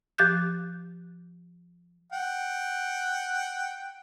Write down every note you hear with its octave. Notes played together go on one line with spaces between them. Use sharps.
F3 G4 D6 F#6 G6
F#5 G5